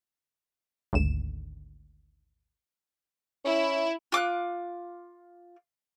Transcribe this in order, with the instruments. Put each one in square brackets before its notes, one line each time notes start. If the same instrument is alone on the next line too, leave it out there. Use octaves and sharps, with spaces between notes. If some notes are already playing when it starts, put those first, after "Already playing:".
[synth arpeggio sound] G#1 D2 E7
[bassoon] C#4 [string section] E4
[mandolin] F4 D6 E6 F#6